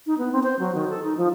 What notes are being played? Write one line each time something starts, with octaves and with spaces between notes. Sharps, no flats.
D#4
B3
C4
C5
F#3
D#3
A4
D#4
F3